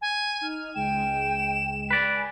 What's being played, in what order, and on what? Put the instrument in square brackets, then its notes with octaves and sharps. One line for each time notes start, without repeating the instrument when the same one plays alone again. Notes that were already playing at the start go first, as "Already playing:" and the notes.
[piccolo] G#5
[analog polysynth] D#4 F6
[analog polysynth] C#2 G#3 [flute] G5 [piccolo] E7
[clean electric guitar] B4 D5
[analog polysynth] G#5